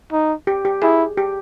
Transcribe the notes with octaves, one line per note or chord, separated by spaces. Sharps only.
D#4
G4
G4
E4 G#4
G4